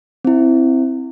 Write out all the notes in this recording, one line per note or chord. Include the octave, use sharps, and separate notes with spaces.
C4 E4